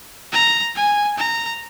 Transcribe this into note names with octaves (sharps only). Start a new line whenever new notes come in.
A#5
G#5
A#5